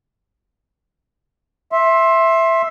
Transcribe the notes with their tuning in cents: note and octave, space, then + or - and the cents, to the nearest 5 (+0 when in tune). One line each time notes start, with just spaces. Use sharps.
E5 +0 C6 +20